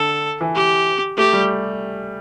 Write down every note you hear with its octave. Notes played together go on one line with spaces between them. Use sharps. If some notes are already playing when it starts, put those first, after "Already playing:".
Already playing: D3 A4
E3
G4
A3 G4
G3